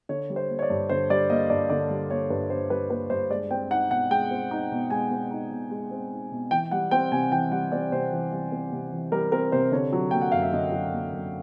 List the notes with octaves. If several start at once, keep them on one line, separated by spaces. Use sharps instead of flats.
D3 C#5
G3
C5
A#3
C#5
D5
G2
D3 C5
G3 D5
A#3 D#5
G2 D5
D3 D5
G3
A#3 C#5
G2 B4
D3 C5
G3 B4
A#3 B4
G2 C5
G#3 D5
C4 G5
D#4 F#5
B2 F#5
G#3 G5
C4
D#4
B2
G#3 G#5
C4
D#4
B2
G#3
C4
D#4
B2
E3 G5
G3 F#5
C4 G5
C3 G#5
E3 G5
G3 F#5
C4 D5
C3 C5
E3
G3
C4
C3
E3
G3 A#4
C4 A#4
C3 C5
D3 C#5
F#3
A#3 G5
F#5
F#2 F5
E5
D3 D#5
F#3
A#3
F#2